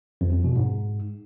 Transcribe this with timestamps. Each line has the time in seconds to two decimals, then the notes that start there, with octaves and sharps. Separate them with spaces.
0.21 F2
0.33 F2
0.44 B2
0.56 G#2